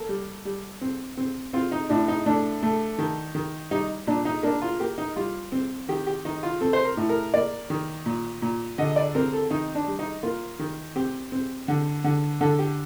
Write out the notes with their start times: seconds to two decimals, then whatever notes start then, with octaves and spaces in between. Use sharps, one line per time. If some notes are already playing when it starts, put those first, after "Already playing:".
Already playing: A#3 A4
0.09 G3
0.45 G3
0.81 C4
1.17 C4
1.53 C4 F4
1.72 D#4
1.89 A2 D4
2.08 D#4
2.26 A3 D4
2.63 A3
2.98 D#3
3.35 D#3
3.71 G3 D#4
4.07 A#2 D4
4.25 D#4
4.43 A#3 D4
4.62 F4
4.80 A#3 G4
4.98 D#4
5.16 G3 F4
5.52 C4
5.88 D#3 G4
6.07 G4
6.25 D#3 D#4
6.43 F4
6.61 C4 A4
6.73 C5
6.85 A#4
6.97 A2
7.09 A#4
7.34 A#3 D5
7.70 D#3
8.06 A#2
8.42 A#2
8.78 D3 D#5
8.96 D5
9.15 C4 A#4
9.33 A4
9.51 D#3 D#4
9.75 D4
9.87 G3
9.99 D#4
10.23 A#3 F4
10.59 D#3
10.96 C4 G4
11.32 C4
11.68 D3
12.04 D3
12.41 D3 A4
12.59 G4